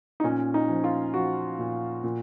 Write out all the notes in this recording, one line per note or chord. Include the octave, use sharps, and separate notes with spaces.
D#4
A#2 C#4
D#4
F3
F4
F3 F#4
A#2
A#2